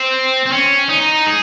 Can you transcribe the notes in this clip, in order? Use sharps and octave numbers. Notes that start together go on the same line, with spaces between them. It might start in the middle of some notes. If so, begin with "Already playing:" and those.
Already playing: C4
C4
C#4
D#4
G#4